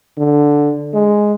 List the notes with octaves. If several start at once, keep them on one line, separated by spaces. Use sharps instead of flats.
D3
G#3